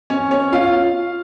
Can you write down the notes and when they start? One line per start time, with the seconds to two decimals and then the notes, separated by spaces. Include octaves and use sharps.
0.10 C#4 C#5
0.31 C#4 C#5
0.52 F4 F5